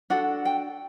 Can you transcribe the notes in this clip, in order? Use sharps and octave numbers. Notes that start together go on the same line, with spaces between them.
D4 F#4 A4 F#5
G5